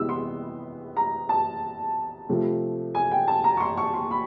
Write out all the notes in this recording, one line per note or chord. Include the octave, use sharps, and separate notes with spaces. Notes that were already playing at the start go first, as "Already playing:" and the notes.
Already playing: C3 E3 G#3 B3 E6
C6
A#5
A5
C3 F3 A3
G#5
G5
A5
A#5
C#6
C6
C#6
C6
B5